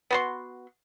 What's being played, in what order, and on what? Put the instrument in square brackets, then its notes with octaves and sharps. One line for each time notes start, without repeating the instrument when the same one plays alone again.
[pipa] B3 F#4 C6